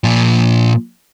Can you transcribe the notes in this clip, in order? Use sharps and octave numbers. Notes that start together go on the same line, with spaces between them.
A#2 F3